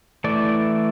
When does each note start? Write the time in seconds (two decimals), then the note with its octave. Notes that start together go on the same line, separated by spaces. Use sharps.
0.24 E3 A3 E4 D5